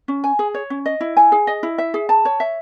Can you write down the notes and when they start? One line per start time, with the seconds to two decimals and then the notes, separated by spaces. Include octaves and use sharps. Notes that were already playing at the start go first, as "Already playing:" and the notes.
0.08 C#4
0.24 G#5
0.39 G#4
0.54 C#5
0.70 C#4
0.86 D#5
1.01 E4
1.17 G#5
1.32 G#4
1.47 D#5
1.63 E4
1.78 E5
1.94 G#4
2.09 A5
2.25 C#5
2.40 E5